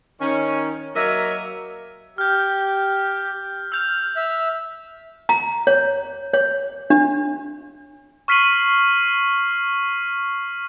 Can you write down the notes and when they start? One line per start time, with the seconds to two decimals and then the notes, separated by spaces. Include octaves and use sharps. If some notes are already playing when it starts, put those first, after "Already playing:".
0.21 D#3 C#4
0.95 F#3 A#3 A#4 D#5 E5
2.18 G4 F6 G6
3.72 E6 F6 G6 F7
4.16 E5
5.29 A#5
5.67 C#5
6.34 C#5
6.90 D4
8.28 C#6 F6 B6 C7 D#7 F#7